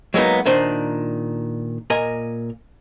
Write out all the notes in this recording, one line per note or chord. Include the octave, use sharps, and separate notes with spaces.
F#3 G#3 A#3 B3 D#4
A#2 D#3 D4 C5
A#2 A#4 D#5 G#5